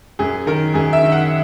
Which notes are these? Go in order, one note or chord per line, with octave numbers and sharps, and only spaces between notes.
F#2 G#4
D#3 A#4
F#2 G#4
E5
D#3
F#5